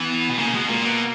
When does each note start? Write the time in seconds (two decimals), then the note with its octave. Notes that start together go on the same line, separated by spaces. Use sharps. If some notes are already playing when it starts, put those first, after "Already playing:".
Already playing: E3 B3
0.29 B2
0.38 C#3 A#3
0.54 B2 G#3
0.69 A#2 A#3
0.85 B2